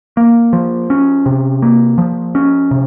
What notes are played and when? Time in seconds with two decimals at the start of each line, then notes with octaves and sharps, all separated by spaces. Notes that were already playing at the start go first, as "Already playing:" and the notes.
0.17 A#3
0.53 F3
0.90 C#4
1.26 C3
1.62 A#3
1.98 F3
2.35 C#4
2.71 C3